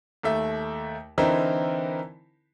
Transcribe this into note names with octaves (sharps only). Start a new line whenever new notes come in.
D#2 A3 E5
D3 E3 C4 D#4 E4 A#4